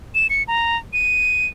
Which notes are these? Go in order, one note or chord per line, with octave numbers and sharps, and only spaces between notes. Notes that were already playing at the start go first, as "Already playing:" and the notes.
E7
C#7
A#5
D#7